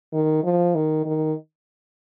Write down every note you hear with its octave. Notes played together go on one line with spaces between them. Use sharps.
D#3
F3
D#3
D#3